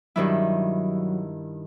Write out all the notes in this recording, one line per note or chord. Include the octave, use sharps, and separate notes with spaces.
G2 D#3 F#3 E4